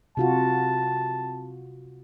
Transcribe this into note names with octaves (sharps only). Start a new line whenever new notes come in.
C3 F4 F#4 A5